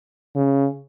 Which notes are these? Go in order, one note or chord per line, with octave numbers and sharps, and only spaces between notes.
C#3